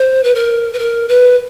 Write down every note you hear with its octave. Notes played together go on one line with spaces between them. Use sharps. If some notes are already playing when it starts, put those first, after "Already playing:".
Already playing: C5
B4
A#4
B4
A#4
B4